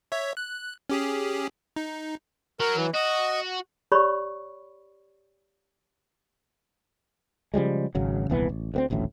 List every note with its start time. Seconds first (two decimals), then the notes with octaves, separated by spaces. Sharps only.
0.12 C#5 E5
0.37 F#6
0.90 C#4 G4 G#4
1.76 D#4
2.60 F#3 A#4
2.77 E3
2.94 F#4 D#5
3.92 G4 C#5 D5 B5 C#6
7.54 C#3 F3 G3 G#3
7.95 G#1 C#3 F#3
8.30 D#1 C2 E3 B3
8.49 A1
8.74 D2 B3 C4
8.90 D#1 A1 D2 A2